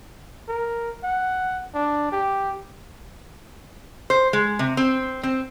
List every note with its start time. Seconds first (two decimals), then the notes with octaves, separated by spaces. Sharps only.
0.48 A#4
1.04 F#5
1.75 D4
2.12 G4
4.10 C5
4.33 G#3
4.59 C3
4.77 C4
5.23 C4